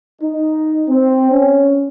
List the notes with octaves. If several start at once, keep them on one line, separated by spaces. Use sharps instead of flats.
D#4
C4
C#4